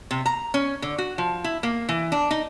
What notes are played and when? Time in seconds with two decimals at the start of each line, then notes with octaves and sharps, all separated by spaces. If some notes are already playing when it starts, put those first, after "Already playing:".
0.11 C3
0.26 A#5
0.54 C#4
0.82 D3
0.98 F#4
1.18 F3
1.44 E4
1.63 A#3
1.89 E3
2.12 D4
2.31 D#4